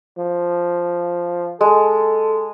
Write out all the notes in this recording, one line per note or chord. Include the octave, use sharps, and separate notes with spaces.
F3
G#3 A4